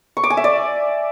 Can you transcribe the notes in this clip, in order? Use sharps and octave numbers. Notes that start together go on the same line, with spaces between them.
C#6
D6
G#5
E5
D5